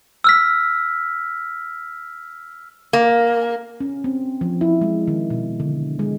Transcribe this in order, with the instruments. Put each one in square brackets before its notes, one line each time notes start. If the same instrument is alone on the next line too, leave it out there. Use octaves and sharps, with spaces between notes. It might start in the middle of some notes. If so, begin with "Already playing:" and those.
[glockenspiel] E6 F6 B6
[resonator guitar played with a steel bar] A#3
[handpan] C#4
C4
F3
E4
G#3
D#3
B2
D3
G#3